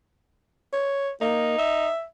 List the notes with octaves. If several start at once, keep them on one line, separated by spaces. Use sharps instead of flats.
C#5
A#3 D#4
E5